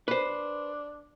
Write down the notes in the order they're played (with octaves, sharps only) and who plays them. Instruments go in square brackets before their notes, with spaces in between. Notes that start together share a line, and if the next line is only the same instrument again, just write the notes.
[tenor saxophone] D4 [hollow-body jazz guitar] B4 C5